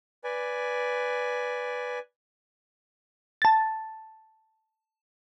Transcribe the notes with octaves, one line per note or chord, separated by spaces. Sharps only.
B4 D5 G#5
A5 A6